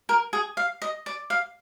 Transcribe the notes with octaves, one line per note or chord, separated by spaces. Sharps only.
A#4
G#4
F5
D#5
D5
F5